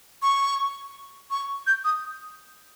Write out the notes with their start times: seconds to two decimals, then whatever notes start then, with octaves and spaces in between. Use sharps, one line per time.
0.22 C#6
1.31 C#6
1.67 G6
1.85 D#6